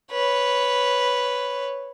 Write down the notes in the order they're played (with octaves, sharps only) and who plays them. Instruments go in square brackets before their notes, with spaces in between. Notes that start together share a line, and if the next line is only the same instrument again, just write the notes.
[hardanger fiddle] B4 C#5